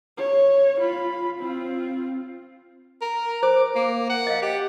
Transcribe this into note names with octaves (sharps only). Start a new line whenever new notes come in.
C#5
F4 B5
C4 F4
A#4
C5 D6
A#3
F#5
D#5 F5
G4